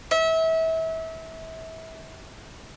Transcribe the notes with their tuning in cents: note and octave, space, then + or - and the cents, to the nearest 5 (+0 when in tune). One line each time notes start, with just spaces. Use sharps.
E5 -30